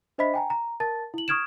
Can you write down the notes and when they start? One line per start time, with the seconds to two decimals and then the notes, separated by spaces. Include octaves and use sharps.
0.18 D4 C5 D#5 E5 B5 B6
0.34 G5 G#5 A#5
0.50 A#5
0.80 A#4 A5 A6
1.14 E4 F#7
1.28 C#6 D#6 F6 G#6 D7 E7